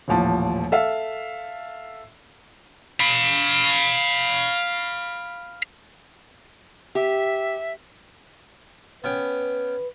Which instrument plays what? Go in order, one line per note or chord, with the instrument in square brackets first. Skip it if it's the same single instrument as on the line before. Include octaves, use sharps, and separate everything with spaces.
[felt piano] D#1 A1 F3 A5
A4 E5 F5
[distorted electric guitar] F5 B5
[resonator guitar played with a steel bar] G4 [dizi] E5
[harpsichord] B3 C#4 G5 [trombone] B4